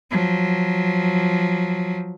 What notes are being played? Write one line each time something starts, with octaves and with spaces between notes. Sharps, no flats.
F3 F#3